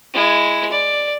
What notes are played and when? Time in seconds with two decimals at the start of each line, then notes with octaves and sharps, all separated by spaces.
0.14 G#3 E4
0.71 D5